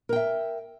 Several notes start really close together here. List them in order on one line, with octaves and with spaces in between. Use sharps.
A#4 G5 E5